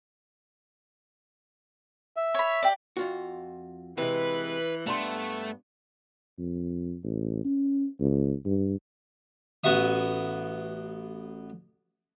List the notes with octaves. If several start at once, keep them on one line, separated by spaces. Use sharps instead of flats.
E5
C#5 B5
G4 D5
F2 F4 F#4
C3 E3 G#3 B4
G2 A3 B3 A#5 C6
F2
A1
C#4
C#2
G2
A1 B3 F#4 E5 D#6